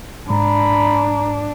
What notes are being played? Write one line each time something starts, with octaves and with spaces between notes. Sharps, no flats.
G#2 D4 A#5 B5